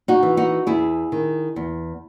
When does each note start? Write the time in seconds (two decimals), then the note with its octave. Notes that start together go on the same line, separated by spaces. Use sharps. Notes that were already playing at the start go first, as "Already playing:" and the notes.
0.08 D#4 F#4
0.23 E3
0.37 D#4 F#4
0.67 E2 E4 G#4
1.12 D#3
1.56 E2